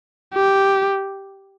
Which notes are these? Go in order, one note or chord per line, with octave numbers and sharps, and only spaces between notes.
G4